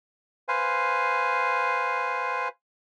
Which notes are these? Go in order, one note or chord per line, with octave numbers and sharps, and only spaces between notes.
B4 C5 F5 G#5